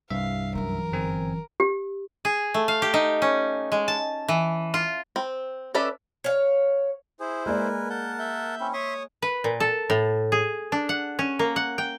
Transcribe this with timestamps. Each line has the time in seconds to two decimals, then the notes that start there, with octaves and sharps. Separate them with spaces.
0.10 C2 G2 E5 F5
0.55 F#2 E3 A#4
0.92 G1 C4 G#5
1.60 G4
2.25 G#4
2.54 A3
2.68 F5
2.82 G4
2.94 D#4
3.22 C#4
3.72 G#3
3.88 A5
4.28 E3
4.74 F4
5.16 C4
5.75 C#4 A4 B4 D5 E5
6.24 C#5 F5
7.20 E4 G#4 C5
7.46 G#3 A#3 A#4 B4 D5 G#5
7.90 A#4 F#5 A5 G6
8.19 E5 G6
8.60 C4 C#4 E4
8.74 C#5 E5 C6 C#6 D#6
9.22 B4
9.44 A#2
9.60 A4
9.90 A2
10.32 G#4
10.72 D4
10.89 F#5
11.19 C#4
11.39 A#3
11.56 F#5
11.78 G5